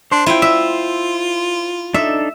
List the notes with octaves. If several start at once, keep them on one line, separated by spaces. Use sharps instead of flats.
D4 C5 C6
E4 F4 G5
E5
D4 D#4 A4 E5